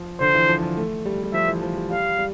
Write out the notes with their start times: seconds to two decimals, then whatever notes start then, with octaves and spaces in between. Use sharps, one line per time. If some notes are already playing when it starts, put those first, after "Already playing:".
Already playing: F3
0.20 D3 C5
0.35 E3
0.49 F3
0.62 F3
0.77 A3
1.06 G3
1.23 G3
1.33 F3 E5
1.48 E3
1.62 F3
1.76 G3
1.90 G3 F5
2.18 G3